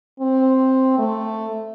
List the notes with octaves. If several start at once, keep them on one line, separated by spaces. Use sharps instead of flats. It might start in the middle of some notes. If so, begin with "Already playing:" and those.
C4
A3